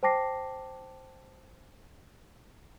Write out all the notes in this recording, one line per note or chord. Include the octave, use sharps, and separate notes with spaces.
C5 G5 A5 D6 A#6 C7